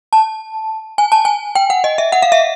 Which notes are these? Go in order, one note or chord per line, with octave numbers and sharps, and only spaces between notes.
A5
G#5
A5
G#5
G5
F#5
D#5
E5
F#5
F5
E5